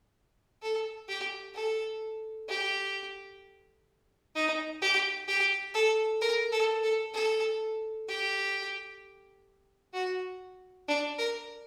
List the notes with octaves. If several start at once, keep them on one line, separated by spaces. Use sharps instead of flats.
A4
G4
A4
G4
D#4
G4
G4
A4
A#4
A4
A4
A4
G4
F#4
D4
A#4